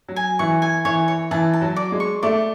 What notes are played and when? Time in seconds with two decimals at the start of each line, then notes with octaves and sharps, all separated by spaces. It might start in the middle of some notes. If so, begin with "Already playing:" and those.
0.08 F#3
0.16 G#5
0.39 E3 C#6
0.62 G#5
0.85 E3 C#5
1.08 C#5
1.31 E3 A5
1.53 A5
1.61 F#3
1.76 D5
1.92 G#3
2.00 C#6
2.23 A3 D5